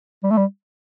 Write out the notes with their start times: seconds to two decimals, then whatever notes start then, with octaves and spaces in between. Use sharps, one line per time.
0.23 G3
0.30 A3
0.37 G3